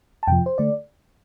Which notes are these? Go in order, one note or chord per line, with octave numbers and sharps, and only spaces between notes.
A5
F2 C3 F3 G5
C5
D3 A3 D5